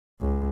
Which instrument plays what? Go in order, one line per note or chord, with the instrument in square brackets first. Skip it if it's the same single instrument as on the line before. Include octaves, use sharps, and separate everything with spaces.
[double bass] C#2